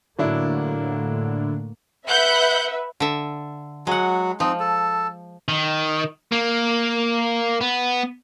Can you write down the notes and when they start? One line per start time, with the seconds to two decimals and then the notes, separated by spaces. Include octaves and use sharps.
0.19 A2 D3 F#3 A3 A#3 D4 E4
2.07 B4 E5 F#5 F#6 G6
3.00 D3 E5
3.87 F#3 G#3 F#5
4.40 F3 C4 D#4
4.60 A4
5.48 D#3
6.32 A#3
7.61 B3